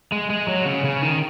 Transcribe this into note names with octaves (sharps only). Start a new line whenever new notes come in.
G#3
G#3
F#3
C#3
C#3
D#3